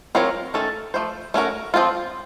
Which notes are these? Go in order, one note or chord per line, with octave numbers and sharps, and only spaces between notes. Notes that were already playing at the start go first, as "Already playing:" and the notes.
F#3 C4 F4 A#4 C#5
D#3 A3 C#4 A4
F3 A3 C5
A3 C#4 F#4 A#4
F3 C4 F4